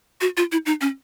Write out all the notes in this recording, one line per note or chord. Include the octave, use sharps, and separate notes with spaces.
F#4
F4
E4
D#4
C#4